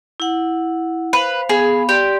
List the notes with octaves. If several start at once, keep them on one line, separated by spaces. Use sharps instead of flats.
E4 F#5
B4 C5 F5
B3 G#4 F5 B5
G4 D5 C6